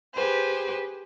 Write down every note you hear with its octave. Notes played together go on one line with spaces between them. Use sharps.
G4 G#4 B4 C5